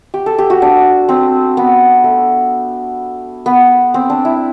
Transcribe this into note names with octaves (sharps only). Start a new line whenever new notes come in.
G4
A4
G4
F#4
D4
C4
B3
A3
B3
C4
D4
E4